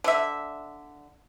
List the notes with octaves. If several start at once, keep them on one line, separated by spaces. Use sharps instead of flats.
D3 E5